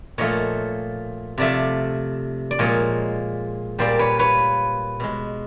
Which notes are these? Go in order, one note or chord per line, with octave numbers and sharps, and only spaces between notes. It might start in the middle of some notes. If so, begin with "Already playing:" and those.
A#2 F3 A3 C#5 D#5
C3 F3 A3 D5 E5
D5
A#2 F3 G#3 C#5 D#5
A#2 G3 A#3 C5 D5
B4 C#5
B4 C#5
B2 G#3